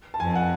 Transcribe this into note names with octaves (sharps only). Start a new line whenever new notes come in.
A5
F2 G#5
F#5